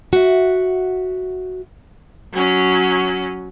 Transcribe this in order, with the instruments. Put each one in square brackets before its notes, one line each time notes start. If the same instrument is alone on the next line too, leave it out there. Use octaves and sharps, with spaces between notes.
[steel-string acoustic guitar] F#4 E5
[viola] F#3 C#4